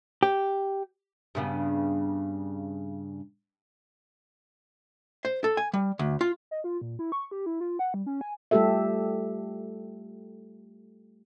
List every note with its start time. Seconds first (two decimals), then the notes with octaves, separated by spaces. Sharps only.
0.23 G4
1.35 G2 C#3 B3
5.25 C5
5.44 A4
5.57 G#5
5.73 G3
5.99 D2
6.21 F4
6.51 D#5
6.64 F4
6.81 A#2
6.99 E4
7.12 C#6
7.31 G4
7.46 E4
7.61 F4
7.79 F#5
7.94 G3
8.06 C#4
8.21 G#5
8.51 G3 A3 F4 G4 A4 E5